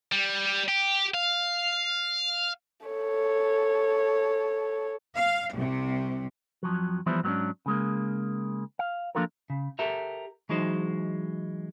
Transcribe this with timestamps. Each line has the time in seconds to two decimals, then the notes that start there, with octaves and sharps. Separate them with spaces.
0.12 G3
0.68 G4
1.14 F5
2.86 A4 C#5
5.15 F5
5.53 C2 C3
6.63 F2 F3 F#3
7.06 E3 F3 G3 B3 E4 C5
7.24 G#2 F#3 G#3 B3 C#4 D4
7.66 C#3 G#3 A#3
8.79 F5
9.15 F3 A#3 D4 F4 A4 A#4
9.50 C#3
9.79 G4 A4 A#4 E5
10.49 E3 F#3 G#3 D#4 C5